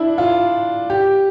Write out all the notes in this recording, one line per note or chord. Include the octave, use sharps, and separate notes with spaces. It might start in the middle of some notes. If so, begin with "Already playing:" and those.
Already playing: D4 E4
F4
G4